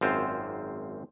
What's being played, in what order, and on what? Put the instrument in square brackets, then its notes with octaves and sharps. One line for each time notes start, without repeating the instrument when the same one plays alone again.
[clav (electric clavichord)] G#1 F#2 C4 F4 C5